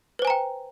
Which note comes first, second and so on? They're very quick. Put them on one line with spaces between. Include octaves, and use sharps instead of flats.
B4 C5 G#5 A#5 G5